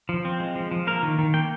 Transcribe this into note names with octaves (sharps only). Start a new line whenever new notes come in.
F3
C4
G#3
F3
F3
A#3 A#4
D#3
D#3
A#3 G5